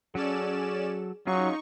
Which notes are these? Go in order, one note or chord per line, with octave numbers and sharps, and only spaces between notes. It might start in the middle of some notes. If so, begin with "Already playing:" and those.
F#3 C#4 G#4 A4 D5 E7
F#3 C#4 D#4 F4 G#4 C#6